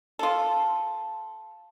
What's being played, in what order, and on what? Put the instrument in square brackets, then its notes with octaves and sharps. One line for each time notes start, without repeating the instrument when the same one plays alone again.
[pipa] F4 A4